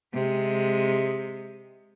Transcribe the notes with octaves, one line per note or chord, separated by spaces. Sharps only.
C3 G#3